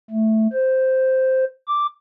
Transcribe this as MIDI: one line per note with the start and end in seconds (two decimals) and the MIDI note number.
0.11 0.48 57
0.53 1.45 72
1.68 1.86 86